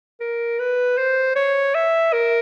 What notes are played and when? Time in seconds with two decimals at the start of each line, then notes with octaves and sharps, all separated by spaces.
0.21 A#4
0.59 B4
0.98 C5
1.36 C#5
1.75 E5
2.13 A#4